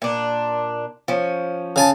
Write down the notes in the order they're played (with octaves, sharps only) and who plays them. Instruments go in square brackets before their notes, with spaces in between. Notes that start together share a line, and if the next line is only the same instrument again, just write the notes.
[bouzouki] A#2 D4
F3 C#4
[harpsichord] C#3 G#5 A5